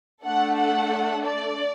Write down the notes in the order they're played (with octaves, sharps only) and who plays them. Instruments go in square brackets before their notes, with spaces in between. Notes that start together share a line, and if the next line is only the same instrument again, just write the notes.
[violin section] A3 D4 A4 F#5
F#5
D5